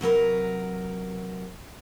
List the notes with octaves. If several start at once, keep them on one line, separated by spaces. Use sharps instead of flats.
C3 F#3 A#4 B4